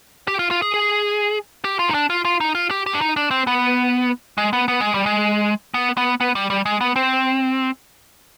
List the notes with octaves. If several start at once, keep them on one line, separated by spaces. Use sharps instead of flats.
G4
F4
F4
G#4
G#4
G4
F4
D#4
D4
F4
F4
D#4
F4
G4
G4
D4
D#4
D4
C4
B3
G#3
B3
B3
G#3
G3
G#3
B3
B3
B3
G3
G3
G#3
B3
C4